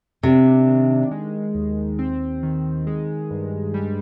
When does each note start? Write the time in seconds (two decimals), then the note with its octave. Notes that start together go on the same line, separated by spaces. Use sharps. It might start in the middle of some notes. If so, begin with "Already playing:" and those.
0.23 C3 D4
0.67 D#3
1.11 G#3
1.55 D#2
1.99 C4
2.43 D#3
2.87 G#3
3.31 G2
3.74 G3